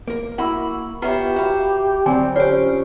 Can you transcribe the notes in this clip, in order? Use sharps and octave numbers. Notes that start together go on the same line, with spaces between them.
A#3 A#4
A#3 E4 F#4 F#5 B5 E6
B3 F4 G4 C#5 E5 A#5
F#4 E5 F5 B5
D3 F#3 G3 C4 G#5
C#4 F4 G4 C5 C#5